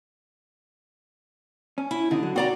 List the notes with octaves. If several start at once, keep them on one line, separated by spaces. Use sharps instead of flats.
C#4
E4
D#2 D3 D#4
F#3
C4 F#4 D5 A#5